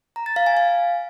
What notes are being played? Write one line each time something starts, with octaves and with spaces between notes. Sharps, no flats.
A#5
A6
F5
G#5
F5